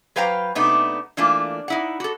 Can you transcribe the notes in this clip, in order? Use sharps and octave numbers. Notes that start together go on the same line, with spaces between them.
F#3 B4 C5 F5 G5 A#5
C3 A3 B3 D4 D#4
E3 A3 A#3 D4 F4
D#4 E4 F#5
F#4 A4